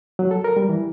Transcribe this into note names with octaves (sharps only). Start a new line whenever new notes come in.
F#3
A4
A#4
G3
E3